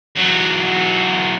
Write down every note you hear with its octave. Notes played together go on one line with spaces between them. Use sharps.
E2 F#3